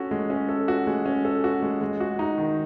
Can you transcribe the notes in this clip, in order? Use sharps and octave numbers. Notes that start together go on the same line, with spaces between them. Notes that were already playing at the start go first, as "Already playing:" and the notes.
Already playing: C#4 F#4 A4
G#3
C#4
A4
F#4
G#3
C#4
A4
F#4
G#3
G#3
F#4
D#4
D#3